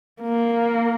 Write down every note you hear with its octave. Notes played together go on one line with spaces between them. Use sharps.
A#3